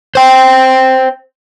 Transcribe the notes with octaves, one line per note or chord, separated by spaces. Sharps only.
C5 G5